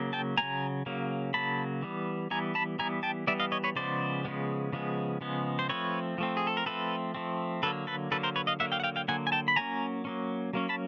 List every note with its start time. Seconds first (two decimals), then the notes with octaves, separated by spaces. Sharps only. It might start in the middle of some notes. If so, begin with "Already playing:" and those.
Already playing: C#3 F#3 A#3
0.13 G5 A5
0.37 C#3 F#3 A#3 G#5 A#5
0.86 C#3 F#3 A#3
1.34 C#3 F#3 A#3 A5 B5
1.82 E3 G3 B3
2.31 E3 G3 B3 G#5 A#5
2.55 A5 B5
2.79 E3 G3 B3 G#5 A#5
3.03 G5 A5
3.27 E3 G3 B3 D5 E5
3.40 D#5 F5
3.52 C#5 D#5
3.64 B4 C#5
3.76 C#3 F3 G#3 B3 C5 D5
4.25 C#3 F3 G#3 B3
4.73 C#3 F3 G#3 B3
5.21 C#3 F3 G#3 B3
5.59 C5
5.69 F3 A3 C4 B4 C#5
6.18 F3 A3 C4
6.37 G#4
6.47 A4
6.57 A#4
6.66 F3 A3 C4 A4 B4
7.15 F3 A3 C4
7.63 D3 F#3 A#3 A4 B4
7.87 A4 B4
8.11 D3 F#3 A#3 A4 B4
8.23 A#4 C5
8.36 B4 C#5
8.47 D#5 F5
8.60 D3 F#3 A#3 E5 F#5
8.72 F5 G5
8.80 F#5
8.84 F5 G5
8.96 F5 G5
9.08 D3 F#3 A#3 F#5 G#5
9.27 G#5
9.32 G5 A5
9.48 B5
9.56 F#3 A#3 C#4 G#5 A#5
10.05 F#3 A#3 C#4
10.53 F#3 A#3 C#4
10.69 A5 B5